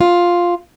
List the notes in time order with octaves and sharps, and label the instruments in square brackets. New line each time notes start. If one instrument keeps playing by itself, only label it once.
[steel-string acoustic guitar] F4